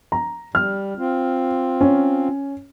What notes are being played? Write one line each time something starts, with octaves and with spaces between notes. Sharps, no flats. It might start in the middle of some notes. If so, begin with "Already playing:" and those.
A#5
G3 F6
C4 F4
C#4